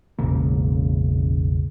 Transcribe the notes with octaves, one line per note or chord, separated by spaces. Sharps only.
E1 A1 C#3 A#3